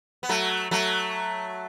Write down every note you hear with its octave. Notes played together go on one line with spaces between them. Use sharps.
B3
F#3 A3
F#3 A3